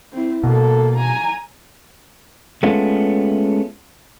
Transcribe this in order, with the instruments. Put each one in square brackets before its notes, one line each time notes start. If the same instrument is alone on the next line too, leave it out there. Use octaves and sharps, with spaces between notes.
[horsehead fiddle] C4 E4
[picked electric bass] B2 [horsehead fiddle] A#3 A4
[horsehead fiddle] G#5 A#5
[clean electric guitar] G#3 A3 B3 C#4 F4